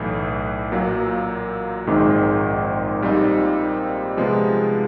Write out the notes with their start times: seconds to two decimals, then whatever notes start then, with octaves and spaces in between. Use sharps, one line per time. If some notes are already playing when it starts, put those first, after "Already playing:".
Already playing: B1 A2 E3
0.72 A#2 F#3 A#3
1.87 A#1 G#2 D#3 G#3 C4
3.02 A#2 G3 C4 D#4
4.17 C3 F3 G#3 B3